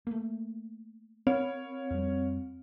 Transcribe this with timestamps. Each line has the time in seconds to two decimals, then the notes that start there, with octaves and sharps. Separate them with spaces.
0.07 A3 A#3
1.27 C4 C#5
1.90 F2 G3